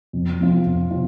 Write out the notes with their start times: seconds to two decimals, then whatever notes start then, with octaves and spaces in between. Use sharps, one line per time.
0.13 F2
0.40 C3 F3 C4 F4
0.65 F2
0.90 C3 F3 C4 F4